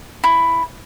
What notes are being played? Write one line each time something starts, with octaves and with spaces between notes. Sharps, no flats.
E4